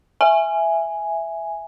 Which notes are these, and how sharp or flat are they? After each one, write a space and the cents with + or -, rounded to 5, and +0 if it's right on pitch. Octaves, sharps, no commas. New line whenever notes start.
E5 +5 G#5 +0